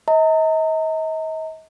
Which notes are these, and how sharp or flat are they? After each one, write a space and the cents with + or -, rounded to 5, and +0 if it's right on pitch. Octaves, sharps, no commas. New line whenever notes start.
D#5 +40 A#5 -35